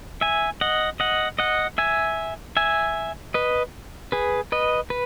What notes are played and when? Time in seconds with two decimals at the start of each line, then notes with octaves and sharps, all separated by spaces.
0.21 E5 G#5
0.61 D#5 F#5
1.00 D#5 F#5
1.39 D#5 F#5
1.78 E5 G#5
2.57 E5 G#5
3.34 B4 D#5
4.12 G#4 B4
4.52 B4 D#5
4.90 B4